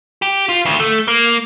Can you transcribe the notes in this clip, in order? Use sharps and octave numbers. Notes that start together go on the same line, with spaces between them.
G4
F4
D2
A3
A#3